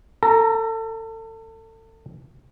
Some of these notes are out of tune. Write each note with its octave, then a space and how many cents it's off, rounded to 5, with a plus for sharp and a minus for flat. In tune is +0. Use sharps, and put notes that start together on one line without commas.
A4 +30 A#5 +0